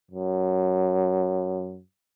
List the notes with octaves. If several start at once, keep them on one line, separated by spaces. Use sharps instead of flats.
F#2